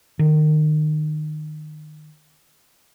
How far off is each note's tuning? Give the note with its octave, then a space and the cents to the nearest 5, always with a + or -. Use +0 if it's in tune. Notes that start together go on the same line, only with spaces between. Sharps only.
D#3 -25